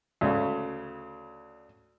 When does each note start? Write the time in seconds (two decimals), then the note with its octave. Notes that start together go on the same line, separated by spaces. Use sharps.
0.21 D2 C#3